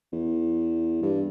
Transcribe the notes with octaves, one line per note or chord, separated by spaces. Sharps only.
E2
G2